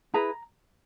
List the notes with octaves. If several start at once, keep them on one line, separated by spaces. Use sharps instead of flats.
E4 G#4 B4 A#5